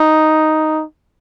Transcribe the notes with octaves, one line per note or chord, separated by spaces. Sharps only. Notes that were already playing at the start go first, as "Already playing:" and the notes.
Already playing: D#4